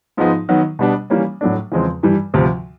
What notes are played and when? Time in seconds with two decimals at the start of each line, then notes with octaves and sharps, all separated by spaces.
0.17 G#2 F3 G#3 B3 D#4
0.49 D#3 F#3 B3
0.79 B2 G3 B3 D4
1.10 E3 G3 A#3 C#4
1.41 A2 F#3 A3 D4
1.72 E2 C#3 F3 G#3 C4
2.03 G2 E3 G3
2.34 D2 C3 F3